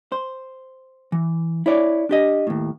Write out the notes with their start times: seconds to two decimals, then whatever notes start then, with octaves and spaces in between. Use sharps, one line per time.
0.12 C5
1.12 E3
1.66 E4 C#5 D5
2.09 D4 G4 D#5
2.47 D#2 A2